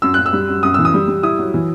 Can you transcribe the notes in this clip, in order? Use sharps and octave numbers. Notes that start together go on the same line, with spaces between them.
F#2 E6
F#2 F#6
E6
G3
F#2
F#2 D#6
E3 E6
D#6
G3
G3
E4 D#6
F#3
E3